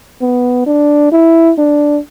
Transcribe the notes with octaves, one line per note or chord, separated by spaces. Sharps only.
B3
D4
E4
D4